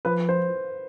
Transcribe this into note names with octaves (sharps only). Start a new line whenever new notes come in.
F3 B4
C5